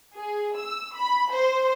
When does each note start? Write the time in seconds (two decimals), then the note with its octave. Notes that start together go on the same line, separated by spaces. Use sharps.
0.16 G#4
0.57 E6
0.95 B5
1.31 C5